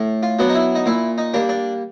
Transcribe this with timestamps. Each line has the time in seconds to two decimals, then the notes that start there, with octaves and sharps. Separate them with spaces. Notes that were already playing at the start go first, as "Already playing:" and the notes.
Already playing: A2
0.23 F4
0.39 F#3 B3 D4
0.49 D#4
0.55 E4
0.75 D#4
0.86 A#2 E4
1.18 D#4
1.34 G3 A#3 D4
1.49 D4